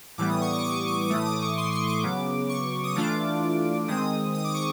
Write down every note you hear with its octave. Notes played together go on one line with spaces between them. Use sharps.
A2 E3 G3 B3 D6
D#6
C#6
D6
C#6
D6
D6
A2 E3 A3 D#6
D6
C#6
C6
C#6
D6
C#3 F#3 B3
C#6
D#6
E3 A3 D4 F4 D6
D#3 G#3 C4 D#6
D#6
D6
C#6